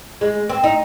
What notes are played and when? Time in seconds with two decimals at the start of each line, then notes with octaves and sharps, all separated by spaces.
0.21 G#3
0.50 C4
0.64 D#4